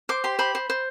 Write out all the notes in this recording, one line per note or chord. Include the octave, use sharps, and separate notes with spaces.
C5 D6
G4 C6
C5 B5
C5
C5